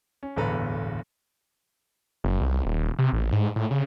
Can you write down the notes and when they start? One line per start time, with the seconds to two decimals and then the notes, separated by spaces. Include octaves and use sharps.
0.23 C#4
0.36 D1 G1 E2 A4 B4 A#5
2.24 F#1
2.41 C2
2.66 D#1
2.99 C3
3.13 A1
3.32 G#2
3.56 A2
3.71 C#3